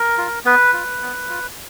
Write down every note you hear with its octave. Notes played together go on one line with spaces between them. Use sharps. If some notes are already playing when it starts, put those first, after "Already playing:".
Already playing: A#4
F4
B3 B4
F4
B3
F4